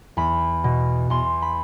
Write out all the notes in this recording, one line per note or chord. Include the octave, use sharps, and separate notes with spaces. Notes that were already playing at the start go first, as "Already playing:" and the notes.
E2 B5
B2
E2 C6
B5